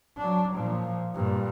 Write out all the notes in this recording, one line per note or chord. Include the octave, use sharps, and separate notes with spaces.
F#3 D4
A#2 F3
G2 A#2